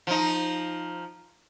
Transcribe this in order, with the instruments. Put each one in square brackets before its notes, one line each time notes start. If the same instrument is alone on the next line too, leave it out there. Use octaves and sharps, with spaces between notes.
[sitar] F3 D#4